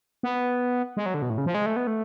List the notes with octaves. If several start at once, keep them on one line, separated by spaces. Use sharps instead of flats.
B3
G#3
F#3
D3
B2
A2
C#3
F3
G#3
A3
B3
A3